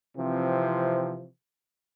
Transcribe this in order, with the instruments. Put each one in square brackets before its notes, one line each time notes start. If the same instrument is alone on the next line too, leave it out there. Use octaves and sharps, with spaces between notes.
[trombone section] C3 E3 F3 C4